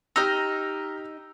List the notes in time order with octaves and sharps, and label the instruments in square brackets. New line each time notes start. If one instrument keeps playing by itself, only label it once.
[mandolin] D#4 D#5 [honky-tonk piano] G4 E6 [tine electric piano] A#5 F6